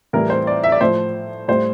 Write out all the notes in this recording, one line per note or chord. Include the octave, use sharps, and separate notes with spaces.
A2 E3 G3 A#4
C5
D5
E5
D5
A2 F3 C5
A2 G3 C5